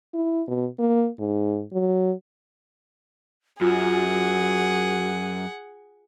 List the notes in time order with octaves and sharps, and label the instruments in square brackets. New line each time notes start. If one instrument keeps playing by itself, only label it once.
[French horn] E4
B2
A#3
G#2
F#3
[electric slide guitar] F#2 [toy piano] F4 [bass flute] F#4 [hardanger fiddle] G#4 F#5